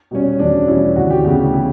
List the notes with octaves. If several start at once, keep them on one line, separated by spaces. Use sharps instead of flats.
B2 G3 C#4
E2 D4
B2 G3 C#4 E4
D2 F#4
G4
C#3 E3 B3 G4
E4